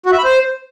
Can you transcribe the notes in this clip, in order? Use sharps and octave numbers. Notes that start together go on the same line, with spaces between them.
F#4
E5
B5
C5